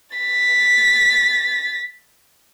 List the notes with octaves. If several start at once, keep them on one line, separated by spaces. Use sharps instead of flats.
A6 B6